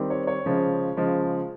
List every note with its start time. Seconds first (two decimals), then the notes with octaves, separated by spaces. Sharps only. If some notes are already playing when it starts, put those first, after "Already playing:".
Already playing: D#3 G3 C4
0.10 C#5
0.27 C#5
0.46 C#3 F3 G#3
0.97 C#3 F3 G#3